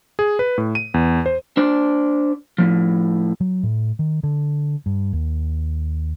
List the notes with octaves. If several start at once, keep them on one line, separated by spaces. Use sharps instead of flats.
G#4
B4
A2
D#7
E2
C5
D4 C5 D5
A2 F3
F#3
A2
D#3
D3
G2
D#2